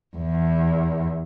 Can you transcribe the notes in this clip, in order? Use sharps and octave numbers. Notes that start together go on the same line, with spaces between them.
E2